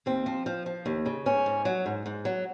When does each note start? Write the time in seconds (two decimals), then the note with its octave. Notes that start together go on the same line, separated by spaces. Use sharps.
0.06 D#2 C4
0.26 F3
0.46 F3
0.66 F3
0.86 D#2
1.06 C#3
1.26 G#2 C#4
1.46 G#2
1.65 F#3
1.86 G#2
2.06 G#2
2.25 F#3